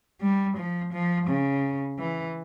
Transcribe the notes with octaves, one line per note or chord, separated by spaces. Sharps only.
G3
F3
F3
C#3
E3